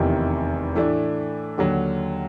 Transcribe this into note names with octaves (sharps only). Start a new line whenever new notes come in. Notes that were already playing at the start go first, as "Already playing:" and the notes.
Already playing: F1 E2 C3 D#3
A2 E3 A3 D4
D#2 D3 F#3